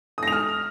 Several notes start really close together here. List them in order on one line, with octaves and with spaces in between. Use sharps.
D#6 A#6 F7 F6